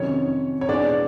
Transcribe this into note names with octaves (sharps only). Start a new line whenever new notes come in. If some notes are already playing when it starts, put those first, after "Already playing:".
Already playing: F2 C3 D#3 F#3 C#4 C#5
C#5
E2 B2 G#3 D4 D5